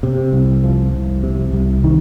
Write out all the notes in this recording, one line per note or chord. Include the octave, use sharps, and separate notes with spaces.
C3
C2
F3
C2
C3
C2
D#3